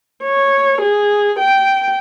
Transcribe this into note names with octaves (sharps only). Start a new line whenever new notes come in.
C#5
G#4
G5